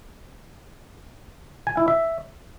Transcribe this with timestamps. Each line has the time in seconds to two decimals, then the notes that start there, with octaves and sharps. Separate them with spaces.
1.67 G#5
1.77 E4
1.88 E5